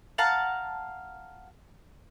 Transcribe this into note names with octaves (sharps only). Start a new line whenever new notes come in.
F5 F#5 A5 A#5